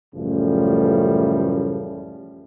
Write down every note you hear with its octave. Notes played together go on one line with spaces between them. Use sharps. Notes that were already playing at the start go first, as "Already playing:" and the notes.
A1 F#2 C#3 F3 G3 A3